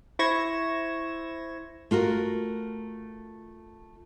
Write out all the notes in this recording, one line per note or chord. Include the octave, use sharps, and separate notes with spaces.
E4 C5 C#6 G#6 A#6 E7
A3 F4 F#4 A#4